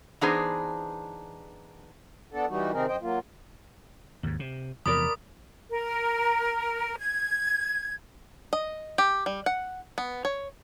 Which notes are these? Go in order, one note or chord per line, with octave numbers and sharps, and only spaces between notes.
E3 B3 D4 D#4 G#4 C5
B3 D4 A4
E3 G3 D#4 F#4
C3 D#3 C4 D#4 G#4 A#4
F#2 C5 D#5 G5
F#3 A#3 F4
D#2 G#2
C3
E2 C3 F3 A#4 D5 B5 D#6
A#4
G#6
D#5
G4
G3
F#5
B3
C#5